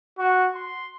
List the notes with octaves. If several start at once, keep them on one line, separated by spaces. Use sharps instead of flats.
F#4
C6